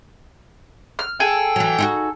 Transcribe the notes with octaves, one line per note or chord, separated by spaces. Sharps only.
F6
G#4 A4 G5
E3 F#3
D#4 E4 F#4